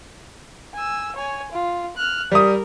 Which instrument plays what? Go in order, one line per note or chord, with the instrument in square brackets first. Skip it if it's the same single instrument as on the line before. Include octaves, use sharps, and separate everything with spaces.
[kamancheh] G#5 E6
C#5 G#5
F4
F6 F#6
[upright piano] G3 D#6 [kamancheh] A#4